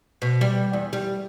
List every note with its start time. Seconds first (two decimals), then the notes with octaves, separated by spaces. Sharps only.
0.22 B2
0.41 G3
0.73 E2
0.93 G3